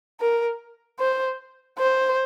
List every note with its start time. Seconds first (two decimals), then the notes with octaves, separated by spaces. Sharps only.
0.21 A#4
0.99 C5
1.79 C5